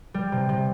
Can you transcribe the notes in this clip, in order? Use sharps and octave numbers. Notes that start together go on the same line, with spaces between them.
G3
C3
C3